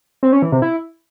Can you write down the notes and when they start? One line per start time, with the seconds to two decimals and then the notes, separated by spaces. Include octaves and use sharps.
0.23 C4
0.32 C#4
0.42 E3
0.52 C3
0.62 E4